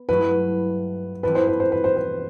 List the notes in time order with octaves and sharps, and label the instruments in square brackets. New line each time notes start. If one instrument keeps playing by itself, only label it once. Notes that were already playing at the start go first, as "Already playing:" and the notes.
Already playing: [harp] B3
[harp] G2 F#3 A3 E4 [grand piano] B4
[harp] E3 G3 C4 E4 A4 [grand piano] B4
[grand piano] C5
B4
C5
B4
C5
B4